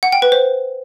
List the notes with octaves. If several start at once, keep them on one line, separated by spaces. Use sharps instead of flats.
F#5
G5
B4
C5